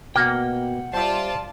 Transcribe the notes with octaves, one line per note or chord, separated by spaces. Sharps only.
B2 A#3 F#5 G5
G3 F4 C5 D5 E5 A5